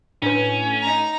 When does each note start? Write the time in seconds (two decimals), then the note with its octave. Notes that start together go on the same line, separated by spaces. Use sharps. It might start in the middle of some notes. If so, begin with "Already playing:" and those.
0.22 A2 C#4 D4 B4
0.82 D#4 A#5